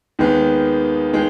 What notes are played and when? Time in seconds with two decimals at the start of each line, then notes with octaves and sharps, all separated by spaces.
0.19 D#2 D#3 G#3 B3
1.13 D#3 G#3